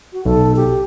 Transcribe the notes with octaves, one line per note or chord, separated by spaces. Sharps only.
F#4
B1 A4
G4